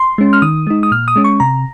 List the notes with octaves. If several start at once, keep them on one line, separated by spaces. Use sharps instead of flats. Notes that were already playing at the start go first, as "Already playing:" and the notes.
Already playing: C6
G#3 C#4
F6
D#3 D#6
G#3 D#4
D#6
A#2 F6
D#6
G#3 C#4
C#6
C3 A#5